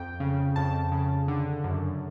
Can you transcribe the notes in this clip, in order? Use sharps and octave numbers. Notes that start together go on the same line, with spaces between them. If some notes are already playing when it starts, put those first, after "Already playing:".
Already playing: F2 G5
C#3
F2 A5
C#3
D3
F#2